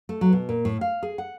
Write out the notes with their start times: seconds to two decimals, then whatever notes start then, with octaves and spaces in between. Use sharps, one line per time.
0.09 A3
0.21 F#3
0.32 B2
0.49 A#2
0.65 A2
0.81 F5
1.03 G#4
1.18 F#5